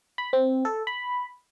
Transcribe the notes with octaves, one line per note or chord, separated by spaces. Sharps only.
B5
C4
A4
B5